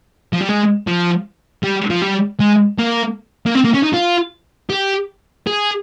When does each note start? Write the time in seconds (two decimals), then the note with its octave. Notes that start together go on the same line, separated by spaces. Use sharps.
0.33 F3
0.41 G3
0.49 G#3
0.87 F3
1.64 G3
1.90 F3
2.02 G3
2.40 G#3
2.78 A#3
3.46 A#3
3.55 C4
3.65 A#3
3.74 C#4
3.84 D#4
3.94 F4
4.70 G4
5.47 G#4